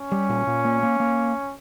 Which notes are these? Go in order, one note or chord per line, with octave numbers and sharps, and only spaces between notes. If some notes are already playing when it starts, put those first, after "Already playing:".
Already playing: C#4
G3
A#2
A#2
A#3
A#3
A#3